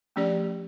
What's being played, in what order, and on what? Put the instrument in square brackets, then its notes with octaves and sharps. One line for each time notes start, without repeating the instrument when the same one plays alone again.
[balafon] F3 A3 C#4 G4 D5